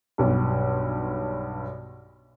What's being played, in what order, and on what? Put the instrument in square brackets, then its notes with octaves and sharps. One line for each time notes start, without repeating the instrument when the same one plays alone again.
[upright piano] B1 G2